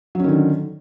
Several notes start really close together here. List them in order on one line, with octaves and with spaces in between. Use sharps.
F#3 C#4 D#3 D3